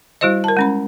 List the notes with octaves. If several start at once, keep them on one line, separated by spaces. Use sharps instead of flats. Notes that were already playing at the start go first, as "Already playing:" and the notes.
G3 E4 F#4 C5 D#5
A#4 A5
G#3 C#4 B5